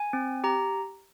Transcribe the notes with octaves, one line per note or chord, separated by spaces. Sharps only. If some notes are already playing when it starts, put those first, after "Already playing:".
Already playing: G#5
C4
G4 A#5